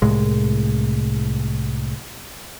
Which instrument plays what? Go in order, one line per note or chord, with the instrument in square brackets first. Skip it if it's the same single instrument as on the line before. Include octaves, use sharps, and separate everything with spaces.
[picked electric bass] C2 A2 G#3